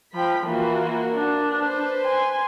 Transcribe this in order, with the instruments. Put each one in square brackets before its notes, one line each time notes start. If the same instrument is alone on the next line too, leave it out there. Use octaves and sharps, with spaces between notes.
[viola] F3 G5 [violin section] B5
[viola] E3 F4 [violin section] A#3 F#4
[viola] D4
[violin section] B4 C5
[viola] G#5 C6